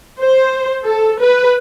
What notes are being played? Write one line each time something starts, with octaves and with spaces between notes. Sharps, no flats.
C5
A4
B4